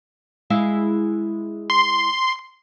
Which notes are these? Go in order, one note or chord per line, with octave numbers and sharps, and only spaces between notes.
G#3 E4 F5
C6